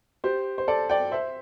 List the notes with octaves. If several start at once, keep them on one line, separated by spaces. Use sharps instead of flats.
G4 C5
C5
A4 D5
D5 G5
C5 E5